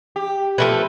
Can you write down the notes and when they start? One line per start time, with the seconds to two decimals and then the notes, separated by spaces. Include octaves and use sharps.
0.16 G4
0.58 F3 A3 B4